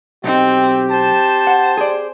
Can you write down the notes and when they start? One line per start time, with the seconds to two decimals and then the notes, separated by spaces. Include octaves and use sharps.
0.24 B1 C4 D#4 G4
0.91 C5 A5
1.47 F#5
1.77 G#4 D5